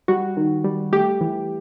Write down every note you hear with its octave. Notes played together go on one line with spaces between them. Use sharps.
G3 F#4
D#3
G3
A3 G4
E3